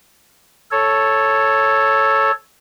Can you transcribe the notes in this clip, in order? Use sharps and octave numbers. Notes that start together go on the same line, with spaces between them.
A4 C#5